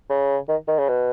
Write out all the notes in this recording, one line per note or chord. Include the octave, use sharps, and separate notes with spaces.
C#3
D#3
D#3
C#3
B2